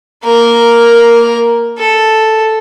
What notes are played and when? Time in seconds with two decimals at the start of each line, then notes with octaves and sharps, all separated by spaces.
0.25 A#3 A#4
1.79 A4